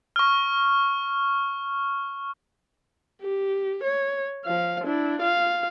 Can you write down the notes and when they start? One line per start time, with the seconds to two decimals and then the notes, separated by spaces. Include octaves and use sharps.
0.16 C#6 F6
3.22 G4
3.84 C#5
4.46 F3 F5
4.84 D4 E4
5.21 F4 F5